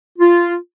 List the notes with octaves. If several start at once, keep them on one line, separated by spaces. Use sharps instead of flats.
F4